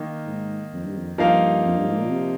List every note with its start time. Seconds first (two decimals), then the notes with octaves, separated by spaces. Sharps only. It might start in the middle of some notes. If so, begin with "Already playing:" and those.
Already playing: D#3 A#3 D#4
0.26 G#2
0.73 F2
0.85 G2
0.96 F2
1.18 G2 F3 A#3 D#4 A#4 F5
1.65 F2
1.76 G2
1.88 G#2
1.99 A#2
2.10 C3